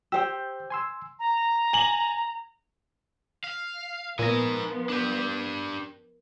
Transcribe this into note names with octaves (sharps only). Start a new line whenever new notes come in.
G4 C5 G5 E6
G#5 C6 E6
A#5
G#5 F#7
F5
A#2 F3 B3 D#4 A#4 G#5 A#6
D4 G4